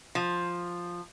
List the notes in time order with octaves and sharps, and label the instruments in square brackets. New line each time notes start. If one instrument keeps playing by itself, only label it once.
[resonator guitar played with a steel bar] F3